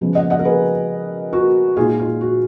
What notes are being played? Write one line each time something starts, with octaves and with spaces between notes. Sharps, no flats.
C#3 F3 G#3 B3
D#5 F#5
D#5 F#5
A#4
G#4 B4
F#4 A#4
A#2 G#3 D#4 F4 G#4
F4
F#4